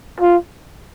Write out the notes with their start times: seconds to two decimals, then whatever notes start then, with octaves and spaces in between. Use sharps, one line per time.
0.21 F4